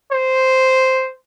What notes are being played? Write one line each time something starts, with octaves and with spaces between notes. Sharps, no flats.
C5